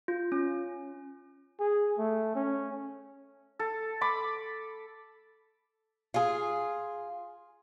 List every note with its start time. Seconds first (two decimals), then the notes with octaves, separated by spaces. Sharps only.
0.08 F4
0.32 C#4
1.60 G#4
1.98 A3
2.35 C#4
3.59 A4
4.01 B5 D6
6.14 F4 G#4